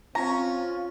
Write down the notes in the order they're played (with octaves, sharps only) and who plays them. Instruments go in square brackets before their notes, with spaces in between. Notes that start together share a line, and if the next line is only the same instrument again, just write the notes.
[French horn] C4 [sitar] C#4 [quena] F4 [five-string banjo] A#5